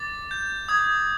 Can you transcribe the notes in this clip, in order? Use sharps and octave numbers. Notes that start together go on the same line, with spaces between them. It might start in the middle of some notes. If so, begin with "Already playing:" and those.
Already playing: D6 A6
G6
D#6 G#6